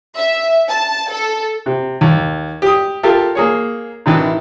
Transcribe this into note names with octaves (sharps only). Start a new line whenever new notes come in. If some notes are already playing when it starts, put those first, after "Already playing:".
E5
A5
A4
C3
D#2
G4 D#6
F4 G4 A4 A#4 F5
A#3 G#4 C#5
A1 D#3 E3